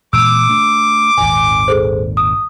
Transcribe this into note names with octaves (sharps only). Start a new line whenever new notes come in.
A#2 E3 G#3 D6 E6
A3 D4
G#1 D#2 A#2 G#5
G#4 A4 C5
D#6